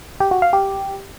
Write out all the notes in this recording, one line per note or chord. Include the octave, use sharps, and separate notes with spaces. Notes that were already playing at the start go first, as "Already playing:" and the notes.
G4
F#4
F5
G4